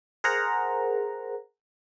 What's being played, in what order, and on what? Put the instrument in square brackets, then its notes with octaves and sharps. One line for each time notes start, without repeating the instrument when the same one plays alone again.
[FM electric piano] G#4 A#4 C5 F#5 A#5